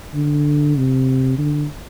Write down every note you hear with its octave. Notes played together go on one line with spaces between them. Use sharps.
D3
C3
D3